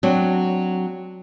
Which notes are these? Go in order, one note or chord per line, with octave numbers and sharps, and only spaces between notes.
F#3 C4 D4